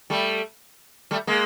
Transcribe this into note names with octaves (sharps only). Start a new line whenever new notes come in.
G3 A3
G3 A3
G#3 A#3